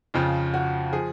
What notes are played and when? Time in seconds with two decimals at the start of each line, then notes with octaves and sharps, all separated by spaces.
0.14 F2 C#3 F3 F4
0.54 F#4
0.92 F3 G#4